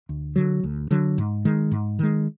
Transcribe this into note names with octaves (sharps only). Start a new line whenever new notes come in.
D2
D3 F#3
D2
D3 F#3
G#2
D#3 G#3
G#2
D#3 G#3